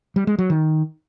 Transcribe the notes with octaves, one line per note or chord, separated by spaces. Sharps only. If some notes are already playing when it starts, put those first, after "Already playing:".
G3
G#3
F#3
D#3